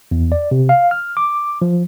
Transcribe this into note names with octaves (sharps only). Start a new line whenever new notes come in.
E2
D5
C3
F5
F6
D6
F3